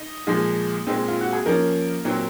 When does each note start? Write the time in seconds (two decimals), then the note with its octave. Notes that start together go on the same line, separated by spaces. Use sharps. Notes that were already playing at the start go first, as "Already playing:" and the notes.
Already playing: D#4 D#5
0.27 A#2 F3 G#3
0.87 A#2 G#3 C4
1.08 F4
1.21 F#4
1.33 G#4
1.46 F3 A#3 C#4 A#4
2.05 A#2 F#3 C4